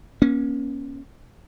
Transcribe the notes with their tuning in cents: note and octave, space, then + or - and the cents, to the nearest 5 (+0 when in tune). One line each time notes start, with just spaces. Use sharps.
A#3 +40 C#4 +0